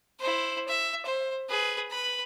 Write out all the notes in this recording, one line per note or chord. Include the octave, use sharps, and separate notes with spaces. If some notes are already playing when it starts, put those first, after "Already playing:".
E4 C5
E5
C5
G#4 B4
B4 B5